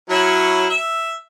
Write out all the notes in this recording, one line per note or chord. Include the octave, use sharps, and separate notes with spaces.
F#3 C#4 E4
E5